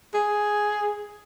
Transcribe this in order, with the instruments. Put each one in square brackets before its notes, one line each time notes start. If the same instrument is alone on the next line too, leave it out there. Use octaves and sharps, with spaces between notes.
[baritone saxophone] G#4